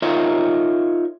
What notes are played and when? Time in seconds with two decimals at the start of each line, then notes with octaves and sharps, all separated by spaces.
0.02 D#4 F4 A#4 C#5 D#5 E5